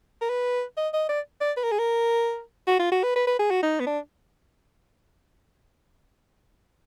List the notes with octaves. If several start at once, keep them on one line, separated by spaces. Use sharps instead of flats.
A#4
B4
D#5
D#5
D5
D5
B4
A#4
G#4
A#4
F#4
F4
F#4
B4
B4
B4
G#4
F#4
D#4
B3
D4